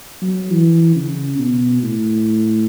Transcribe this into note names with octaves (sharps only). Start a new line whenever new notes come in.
F#3
E3
C#3
B2
A2